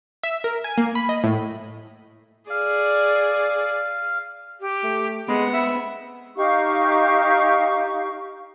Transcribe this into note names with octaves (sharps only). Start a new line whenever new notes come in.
E5
A#4
G#5
A#3
B5
D#5
A2
G#4 D5 F5
G4
A3
G#3 B3 C4 B4 F#5 B5
E5
D#4 G4 F5 C#6